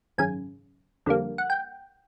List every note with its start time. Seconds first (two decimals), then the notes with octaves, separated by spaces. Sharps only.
0.18 G#1 F#2 C#3 G#5
1.06 F2 D3 G3 A#3
1.38 F#5
1.50 G5